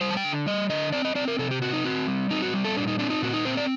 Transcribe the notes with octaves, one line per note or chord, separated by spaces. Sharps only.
G3 C5
A5
G5
D3
G3 D#5
D3 D#5
C4 D5
D#5
C4 D5
A#4
C3 A4
G4
C4 F#4
D#4
C4 F#4
G3
C4 D#4
F#4
G3
A4
A#2 D4
D#4
C4 D4
D#4
A#2 F#4
D#4
C4 C5
D5